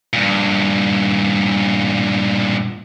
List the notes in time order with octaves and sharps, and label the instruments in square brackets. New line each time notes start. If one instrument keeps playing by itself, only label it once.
[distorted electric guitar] G2 A#2